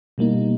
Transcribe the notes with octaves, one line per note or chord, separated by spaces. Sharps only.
B2 G3 A#3 D#4